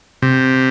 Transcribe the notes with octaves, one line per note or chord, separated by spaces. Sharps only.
C3